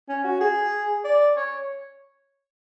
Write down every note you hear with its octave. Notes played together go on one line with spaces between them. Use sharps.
C#4
F#4
G#4
D5
C#5